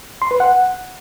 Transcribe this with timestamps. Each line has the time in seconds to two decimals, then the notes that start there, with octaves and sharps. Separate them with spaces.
0.22 C6
0.31 B4
0.40 F#5